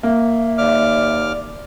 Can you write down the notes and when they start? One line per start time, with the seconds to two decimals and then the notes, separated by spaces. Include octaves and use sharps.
0.03 A#3 E5
0.58 D#2 D5 D6 F6